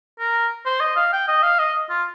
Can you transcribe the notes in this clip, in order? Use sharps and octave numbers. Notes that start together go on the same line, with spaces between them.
A#4
C5
D#5
F5
G5
D#5
F5
D#5
F4